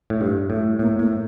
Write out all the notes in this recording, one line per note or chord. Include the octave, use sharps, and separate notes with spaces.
A2
G2 G3
A2 A3
A2 A#3
A2 A#3